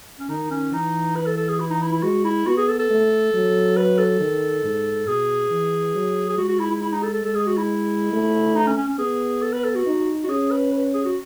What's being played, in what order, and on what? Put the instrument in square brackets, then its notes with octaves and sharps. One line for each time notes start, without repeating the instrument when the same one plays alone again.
[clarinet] C#4
[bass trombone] D#3 [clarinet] D#4
[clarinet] C#4
[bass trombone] E3 [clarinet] D#4
[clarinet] B4
A4
A4
G#4
E4
D#4
E4
E4
[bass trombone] G#3 [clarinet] F#4
[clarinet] E4
[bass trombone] B3 [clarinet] F#4
[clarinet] G#4
A4
A4
[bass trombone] A3
F#3
[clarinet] B4
A4
[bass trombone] D#3
G#2
[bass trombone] B2 [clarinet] G#4
[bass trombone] E3
F#3
[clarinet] G#4
[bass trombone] G#3 [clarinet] F#4
[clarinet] F#4
E4
E4
E4
D#4
A4
A4
[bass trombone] G#3 [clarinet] A4
[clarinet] G#4
F#4
E4
[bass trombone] A3
[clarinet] D#4
C#4
C#4
C#4
[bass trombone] B3 [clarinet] G#4
[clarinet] A4
B4
A4
F#4
[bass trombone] D#4
[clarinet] F#4
[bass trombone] C#4 [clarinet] G#4
[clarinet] B4
B4
G#4
F#4